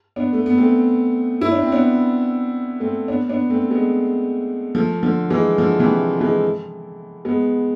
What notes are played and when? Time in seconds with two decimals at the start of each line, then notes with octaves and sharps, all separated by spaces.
0.16 B3 D4
0.33 A3
0.46 B3
0.58 A3 C4
1.41 E4
1.52 D4
1.62 C4
1.72 B3 D4
2.80 A3 C4
3.08 B3 D4
3.29 B3 D4
3.50 A3 C4
3.71 G#3 B3
4.75 F3 A3
5.03 D3 F3
5.30 E3 G#3
5.58 D3 F3
5.79 C3 E3
6.21 E3 G#3
7.25 G#3 B3